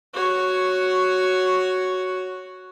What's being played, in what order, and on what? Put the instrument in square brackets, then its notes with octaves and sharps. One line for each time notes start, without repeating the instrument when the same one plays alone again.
[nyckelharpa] F#4 C#5